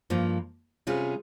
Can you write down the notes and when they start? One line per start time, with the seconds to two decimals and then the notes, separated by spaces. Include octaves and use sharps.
0.10 G2 F3 A#3
0.87 C3 G3 C#4 F4 G#4